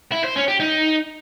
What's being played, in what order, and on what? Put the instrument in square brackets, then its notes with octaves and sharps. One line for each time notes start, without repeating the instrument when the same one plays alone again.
[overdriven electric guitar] E4
C5
C#4
G4
D#4